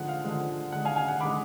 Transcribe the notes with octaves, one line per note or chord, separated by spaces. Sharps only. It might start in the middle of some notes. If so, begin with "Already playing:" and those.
Already playing: D3 F3 G#3 F#5
F5
D3 F3 G#3
D3 G#3 F#5
F5 G#5
F5 G#5
F#5
D3 G#3 B5 D6